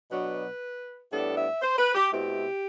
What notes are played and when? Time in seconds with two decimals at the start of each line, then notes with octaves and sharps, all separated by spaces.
0.11 B2 F#3 B3 D4 B4
1.12 A2 G3 B3 D4 A4
1.37 E5
1.62 C5
1.78 B4
1.95 G4
2.12 B2 A3 C4 E4 G4